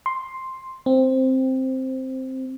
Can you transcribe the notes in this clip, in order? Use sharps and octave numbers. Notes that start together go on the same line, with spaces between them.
C6
C4